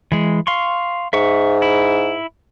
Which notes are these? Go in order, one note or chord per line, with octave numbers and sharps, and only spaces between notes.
E3 G#3
F5 C6 C#6
G#2 E5 C#6
E4